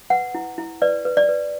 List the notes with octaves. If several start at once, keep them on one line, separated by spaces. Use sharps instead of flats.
B4 F#5
E4
E4
B4 D5
B4
D5
B4